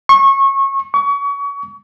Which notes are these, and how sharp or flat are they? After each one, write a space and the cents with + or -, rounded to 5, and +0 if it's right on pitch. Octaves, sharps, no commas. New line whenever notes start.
C#6 -25
C#6 +30